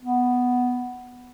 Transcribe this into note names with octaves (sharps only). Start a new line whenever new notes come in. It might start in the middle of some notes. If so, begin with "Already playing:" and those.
B3